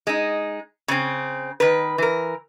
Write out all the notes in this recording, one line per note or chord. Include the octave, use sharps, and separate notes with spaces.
G#3 D#4
C#3 C4
D#3 B4
E3 A#4